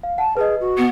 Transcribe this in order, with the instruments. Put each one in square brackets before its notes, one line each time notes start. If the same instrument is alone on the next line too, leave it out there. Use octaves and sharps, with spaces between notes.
[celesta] F5
[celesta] F#5 [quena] A5
[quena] G#4 [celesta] B4 D#5
[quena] F#4
[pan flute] B3